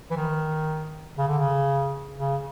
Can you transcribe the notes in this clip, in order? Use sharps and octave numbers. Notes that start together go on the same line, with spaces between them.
E3
D#3
C#3
D3
C#3
C#3